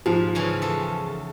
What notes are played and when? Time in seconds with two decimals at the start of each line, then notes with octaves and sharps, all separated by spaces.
0.06 G#2 F3
0.35 C#3 E3 C#4
0.62 E2 A4